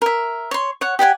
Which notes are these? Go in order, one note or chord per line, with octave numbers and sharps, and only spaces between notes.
A#4 E5
C#5 C6
C#5 F#5
G4 D5 F#5 G#5